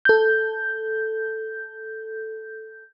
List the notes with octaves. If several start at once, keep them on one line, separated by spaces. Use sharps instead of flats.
A4 G6